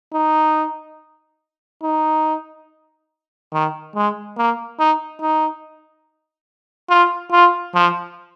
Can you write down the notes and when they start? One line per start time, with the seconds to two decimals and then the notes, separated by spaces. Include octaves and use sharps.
0.14 D#4
1.83 D#4
3.53 D#3
3.95 G#3
4.38 A#3
4.79 D#4
5.21 D#4
6.90 F4
7.32 F4
7.74 F3